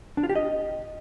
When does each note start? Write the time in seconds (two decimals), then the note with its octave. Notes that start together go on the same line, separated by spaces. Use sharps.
0.17 D4
0.23 F4
0.29 G4
0.36 D#5